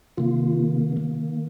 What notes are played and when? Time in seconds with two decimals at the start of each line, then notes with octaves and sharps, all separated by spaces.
0.17 C3 D#3 A#3 F4
0.96 D#3 A#3